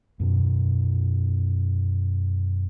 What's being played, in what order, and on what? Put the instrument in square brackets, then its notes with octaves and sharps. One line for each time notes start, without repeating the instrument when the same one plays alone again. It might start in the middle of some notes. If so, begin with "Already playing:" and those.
[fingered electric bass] F#2 B2